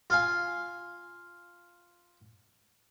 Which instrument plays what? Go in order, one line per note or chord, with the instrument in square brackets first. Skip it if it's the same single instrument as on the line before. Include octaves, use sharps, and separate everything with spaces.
[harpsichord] F4 F5 G#5